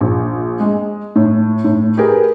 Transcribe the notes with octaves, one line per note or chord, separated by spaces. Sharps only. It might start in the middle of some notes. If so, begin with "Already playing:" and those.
A#1
G#3
A2
A2
G4 G#4 A#4 B4